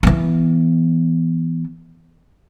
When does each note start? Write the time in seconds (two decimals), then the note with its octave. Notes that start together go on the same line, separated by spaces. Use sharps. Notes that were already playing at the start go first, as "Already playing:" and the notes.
0.03 E3 B3